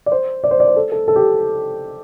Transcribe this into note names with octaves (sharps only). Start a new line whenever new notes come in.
D5
C5
D5
C5
D5
C5
A4
A4
A4
G4